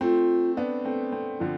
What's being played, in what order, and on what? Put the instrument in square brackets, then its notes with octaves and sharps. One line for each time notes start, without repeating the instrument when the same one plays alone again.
[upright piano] A3 C4 [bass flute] F4
[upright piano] B3 D4
A3 C4
A3 C4
D3 F3